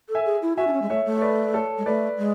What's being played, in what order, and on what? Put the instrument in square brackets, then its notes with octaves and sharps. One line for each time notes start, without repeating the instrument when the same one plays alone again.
[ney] A4
[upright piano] E5 G#5
[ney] G#4
E4
[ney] F#4 [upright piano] E5 G#5
[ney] D4
C#4
G#3
[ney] A3 [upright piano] C#5 E5
[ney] A3
[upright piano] C#5
B4 D5
A4 C#5
[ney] G#3
[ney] A3 [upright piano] B4 D5
[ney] G#3